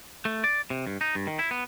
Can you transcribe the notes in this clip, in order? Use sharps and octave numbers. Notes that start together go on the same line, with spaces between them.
A3
D5
C3
G2
D#4
G2
D#3
E4
B3